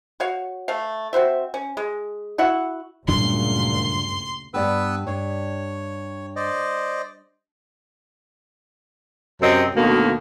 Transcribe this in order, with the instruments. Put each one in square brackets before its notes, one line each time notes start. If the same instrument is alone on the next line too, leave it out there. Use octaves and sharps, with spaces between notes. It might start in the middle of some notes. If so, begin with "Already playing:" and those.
[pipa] F#4 C#5 F5
A3 F5
C4 F#4 C5 E5
C#4
G#3
E4 F#4 E5 F#5
[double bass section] F#1 D2 A#2 [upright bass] G2 [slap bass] C#3 F#3 D4 [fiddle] C6
[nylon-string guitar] G2 D5 G5 [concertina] B3 B4 E6
[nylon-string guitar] G2 [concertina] C#5
[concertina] C5 D5 D#5
[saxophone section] F#2 C3 C4 D#5
D2 B2 D#3 A#3